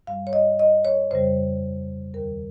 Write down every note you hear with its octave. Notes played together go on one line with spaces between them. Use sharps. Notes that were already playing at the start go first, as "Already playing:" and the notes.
G2 G3 F5
C#5
D#5
D#5
C#5
F2 C#3 G3 C5
D#2 D#3 G3 A#4